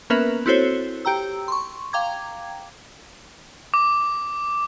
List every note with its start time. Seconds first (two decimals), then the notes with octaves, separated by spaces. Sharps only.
0.10 A#3 B3 C#4 A#4 B4 E5
0.46 C4 E4 F#4 A4 C5 C#5
1.05 G4 G5 A#5 E6
1.48 C6 C#6
1.93 F5 G5 A#5 D6 G#6
3.74 D6